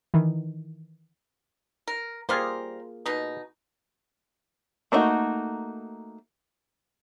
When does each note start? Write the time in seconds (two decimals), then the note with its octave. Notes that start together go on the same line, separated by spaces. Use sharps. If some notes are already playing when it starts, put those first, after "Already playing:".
0.14 D#3 E3
1.87 A#4
2.29 G3 A#3 F4 G#4 A#4 C5
3.06 B2 D#4
4.92 A3 A#3 D4 D#4 F#4